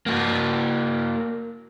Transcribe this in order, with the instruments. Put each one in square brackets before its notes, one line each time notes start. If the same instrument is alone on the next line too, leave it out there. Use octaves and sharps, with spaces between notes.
[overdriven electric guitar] A#3 F#4